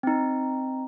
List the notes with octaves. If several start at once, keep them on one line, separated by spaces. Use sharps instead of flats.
C4 D#4